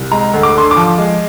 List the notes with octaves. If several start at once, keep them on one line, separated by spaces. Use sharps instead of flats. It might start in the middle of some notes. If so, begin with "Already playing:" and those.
Already playing: C2
G#3 A#5
D2
D6
D3 C6
D6
F3
G#3